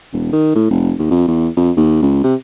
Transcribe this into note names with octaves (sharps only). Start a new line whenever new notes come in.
E1
D#3
A2
F1
D#2
F2
E2
F2
D#2
C#2
C3